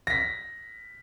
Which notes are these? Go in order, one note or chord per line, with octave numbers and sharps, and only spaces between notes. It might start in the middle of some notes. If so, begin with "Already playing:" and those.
A#6 B6